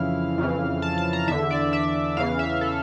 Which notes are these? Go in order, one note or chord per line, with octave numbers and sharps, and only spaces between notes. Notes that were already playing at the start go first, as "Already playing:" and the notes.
Already playing: F2 C#3 E3 F5
F2 C#3 E3
A5
A5
A#5
E2 D3 E5
D5
E5
E2 C#3 E3 F5
E5
A4